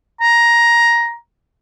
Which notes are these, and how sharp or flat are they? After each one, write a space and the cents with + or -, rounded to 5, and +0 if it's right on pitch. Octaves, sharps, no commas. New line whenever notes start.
A#5 +10